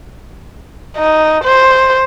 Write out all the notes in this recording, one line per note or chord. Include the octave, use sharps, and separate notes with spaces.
D#4
C5